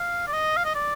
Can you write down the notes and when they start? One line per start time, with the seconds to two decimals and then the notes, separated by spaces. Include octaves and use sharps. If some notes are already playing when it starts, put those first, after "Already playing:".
Already playing: F5
0.28 D5
0.33 D#5
0.57 F5
0.65 D#5
0.75 D5